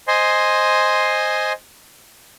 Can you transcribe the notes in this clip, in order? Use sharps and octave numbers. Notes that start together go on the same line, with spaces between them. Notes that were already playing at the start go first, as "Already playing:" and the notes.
C5 D#5 G#5 C6